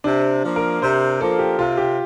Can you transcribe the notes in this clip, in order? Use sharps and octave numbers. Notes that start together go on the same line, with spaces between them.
C3 D4
F3 A#3
A#4
C3 C5
F3 A#3 A4
G4
C3 F4
G4